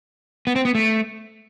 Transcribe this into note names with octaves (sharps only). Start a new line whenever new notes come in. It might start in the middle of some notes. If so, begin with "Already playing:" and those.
B3
C4
B3
A3